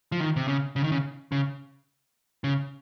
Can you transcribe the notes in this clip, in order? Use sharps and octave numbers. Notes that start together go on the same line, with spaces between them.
F3
D#3
C3
C#3
C#3
D#3
C#3
C#3
C#3